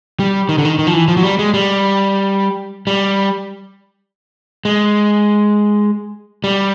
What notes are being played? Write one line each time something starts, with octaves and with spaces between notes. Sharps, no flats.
G3
D#3
D3
D#3
D#3
F3
E3
F3
F#3
G3
G#3
G3
G3
G#3
G3